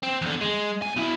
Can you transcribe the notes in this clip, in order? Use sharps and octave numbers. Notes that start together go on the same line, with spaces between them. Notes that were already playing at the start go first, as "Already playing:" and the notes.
C4
E2 D3
G#3
B1 G#5
B2 E4